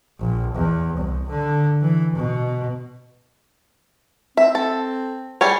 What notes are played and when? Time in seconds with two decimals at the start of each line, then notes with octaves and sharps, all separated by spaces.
0.20 A#1
0.54 E2
0.98 C2
1.30 D3
1.82 E3
2.16 B2
4.37 C4 E5
4.55 A4
5.41 G3 G#4 C#5